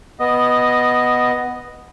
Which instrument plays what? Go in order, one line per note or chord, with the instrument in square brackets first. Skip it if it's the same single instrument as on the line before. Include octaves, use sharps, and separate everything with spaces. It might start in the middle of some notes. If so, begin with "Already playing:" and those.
[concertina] B3 D#5